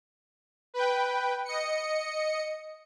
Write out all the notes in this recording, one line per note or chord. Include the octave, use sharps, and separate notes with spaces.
B4 G5
D#5 C#7